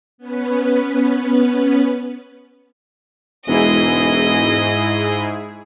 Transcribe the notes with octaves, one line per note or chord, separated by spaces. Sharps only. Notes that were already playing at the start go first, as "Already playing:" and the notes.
B3 C#4 B4
E1 G#2 E4 G#4 D#5